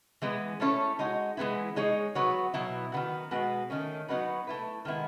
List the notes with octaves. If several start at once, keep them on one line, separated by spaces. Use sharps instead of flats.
E3 G#3 B3
A3 C#4 E4 A4 C#5
G#3 D#4 F#4
E3 G#3 B3 E4
G#3 D#4 G#4 C#5
F#3 B3 F#4 C#5
B2 F#3 B3 E4
D#3 F#3 B3 F#4
B2 G#3 B3 F#4
D#3 A3 C#4
F#3 B3 D#4 F#4 B4
A3 E4 B4
D#3 G#3 B3 E4